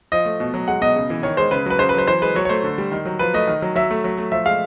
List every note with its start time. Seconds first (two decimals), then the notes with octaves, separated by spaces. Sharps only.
0.12 F3 D#5
0.26 A3
0.40 B2
0.54 F#3
0.68 G#3 F#5
0.81 B2 D#5
0.96 C#3
1.10 E3
1.23 D#3 C#5
1.37 G#3 C5
1.51 C#3 B4
1.66 F#3 B4
1.79 C#3 C5
1.89 B4
1.94 F#3 C5
2.07 E3 C5
2.22 G#3 B4
2.35 F#3 C#5
2.45 C#5
2.49 A3 C5
2.64 D3
2.78 G3
2.92 D#3
3.06 F#3
3.19 F3 B4
3.34 A3 D#5
3.47 D#3
3.62 F#3
3.76 F#3 E5
3.91 A3
4.04 F#3
4.18 A3
4.32 F3 E5
4.46 G#3 F5